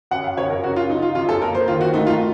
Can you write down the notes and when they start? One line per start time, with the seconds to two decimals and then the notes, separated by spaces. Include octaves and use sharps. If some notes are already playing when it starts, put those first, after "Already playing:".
0.11 F#2 F#5
0.24 F5
0.37 F#2 C#5
0.50 A#4
0.63 C#3 F#4
0.76 F4
0.89 F#3 D#4
1.02 F4
1.15 F#2 F4
1.29 A4
1.41 A#3 A#4
1.55 C5
1.68 D#3 F4
1.81 F#4
1.94 A3 D#4
2.07 F4